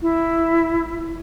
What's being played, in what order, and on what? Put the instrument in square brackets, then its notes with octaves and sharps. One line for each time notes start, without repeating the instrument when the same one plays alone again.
[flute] E4